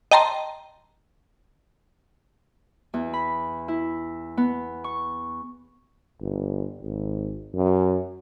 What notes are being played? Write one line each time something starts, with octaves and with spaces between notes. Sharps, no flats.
D#5 G5 A5 A#5 C6
E2
B5
E4
B3
C#6
G1
G#1
F#2